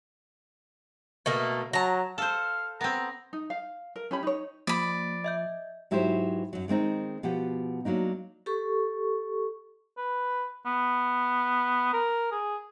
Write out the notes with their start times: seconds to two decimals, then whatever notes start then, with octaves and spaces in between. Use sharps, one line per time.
1.26 B2 A3 A#3
1.73 F#3 A5 A#5
2.18 A4 C5 F5
2.81 B3 C4 A#5
3.33 D#4
3.50 F5
3.96 A#4
4.11 C#4 G4 B5
4.23 D#4 C#5
4.67 F3 A#3 D5 B5
5.24 D#5 E5 G6
5.91 G#2 F#3 E4 G4 B4 C5
6.53 F#2 F#3
6.68 D#3 G#3 C4 D#4
7.23 B2 F3 G4 F#5
7.85 F#3 A#3 D4 D#4
8.46 G4 A4 C#6
9.98 B4
10.66 B3
11.93 A#4
12.31 G#4